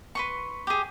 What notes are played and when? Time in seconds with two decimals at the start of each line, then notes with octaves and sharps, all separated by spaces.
0.15 B4 C6 C#6
0.67 G4 G#4